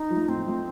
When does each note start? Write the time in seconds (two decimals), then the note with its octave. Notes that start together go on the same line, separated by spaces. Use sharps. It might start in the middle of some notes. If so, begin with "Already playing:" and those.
Already playing: D#4
0.10 F3
0.16 A3
0.28 A2 C4
0.46 F3 A3